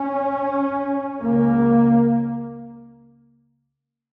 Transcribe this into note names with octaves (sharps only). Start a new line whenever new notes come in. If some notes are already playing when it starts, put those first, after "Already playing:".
Already playing: C#4
C#2 C#3 A#3